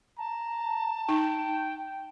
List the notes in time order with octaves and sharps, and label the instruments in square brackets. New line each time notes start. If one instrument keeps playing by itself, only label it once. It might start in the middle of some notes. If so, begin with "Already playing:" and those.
[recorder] A5 [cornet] A#5
[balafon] D#4 [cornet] G5